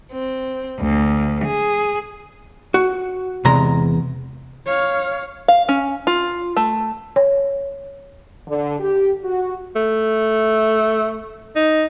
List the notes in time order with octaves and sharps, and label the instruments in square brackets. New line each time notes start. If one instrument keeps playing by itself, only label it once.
[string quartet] C4
D2
G#4
[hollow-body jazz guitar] F#4
[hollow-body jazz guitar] E2 G#3 A#5 [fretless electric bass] C3
[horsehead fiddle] C#5 F5
[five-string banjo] F5
C#4
F4
A3
[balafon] C#5
[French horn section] D3
G4
F#4
[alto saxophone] A3
D#4